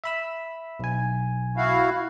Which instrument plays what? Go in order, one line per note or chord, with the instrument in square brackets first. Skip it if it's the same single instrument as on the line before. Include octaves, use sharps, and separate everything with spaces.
[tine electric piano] E5 B5 E6
B1 G#5
[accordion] E4 F#4 F5